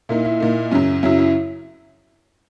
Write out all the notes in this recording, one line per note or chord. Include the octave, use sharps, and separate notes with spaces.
A#2 A#3 D#4 E4
E4
A#2 A#3 D#4
F#2 C#3 F#3 C#4
F#2 C#3 F#3 C#4 E4
E4